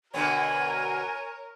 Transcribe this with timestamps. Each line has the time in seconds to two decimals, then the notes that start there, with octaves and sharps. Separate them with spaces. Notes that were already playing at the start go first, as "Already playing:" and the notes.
0.14 B2 D3 B3 A#4 C#5 G#5